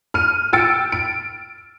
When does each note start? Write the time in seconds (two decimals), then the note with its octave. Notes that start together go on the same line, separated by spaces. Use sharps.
0.14 F6 D#7
0.53 G5 E6 A6 C#7 D7
0.92 D7